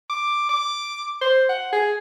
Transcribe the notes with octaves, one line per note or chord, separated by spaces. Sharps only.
D6
D6
C5
F#5
G#4